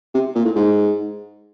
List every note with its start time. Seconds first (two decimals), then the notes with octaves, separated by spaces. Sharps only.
0.14 C3
0.35 A#2
0.45 A2
0.55 G#2